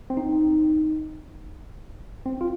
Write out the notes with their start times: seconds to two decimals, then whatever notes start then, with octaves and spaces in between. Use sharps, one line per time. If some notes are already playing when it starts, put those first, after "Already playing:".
0.10 C4
0.17 D#4
2.26 C4
2.41 F4